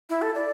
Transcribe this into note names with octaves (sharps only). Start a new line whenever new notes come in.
E4
A4
D5